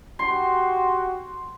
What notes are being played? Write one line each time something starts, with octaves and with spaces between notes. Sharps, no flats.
F#4 G4 C6